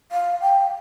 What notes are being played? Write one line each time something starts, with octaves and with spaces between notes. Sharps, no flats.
F5
G5